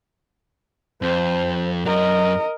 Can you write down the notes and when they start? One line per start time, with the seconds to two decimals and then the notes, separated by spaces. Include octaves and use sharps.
1.02 F2 C5
1.86 F#2 F#3 A#4 D#5